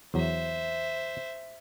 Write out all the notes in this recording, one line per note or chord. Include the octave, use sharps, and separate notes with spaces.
E2 F#3 C5 E5